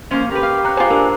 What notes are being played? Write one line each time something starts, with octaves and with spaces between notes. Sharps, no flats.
F3 A#3 C#4 C5
G4 A#4 B4
F5
C#5 A#5 F#6
F4 G#4 C5 D6
A#3 D4 A#4